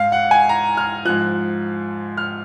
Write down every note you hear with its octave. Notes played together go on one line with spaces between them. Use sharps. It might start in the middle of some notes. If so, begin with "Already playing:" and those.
Already playing: G#2 F5
F#5
G#5
A#5
F6
G#2 F3 F#6
F6